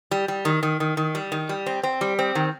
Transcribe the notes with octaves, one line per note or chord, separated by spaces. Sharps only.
G3
G3
D#3
D#3
D#3
D#3
G3
D#3
G3
C4
C4
G3
C4
D#3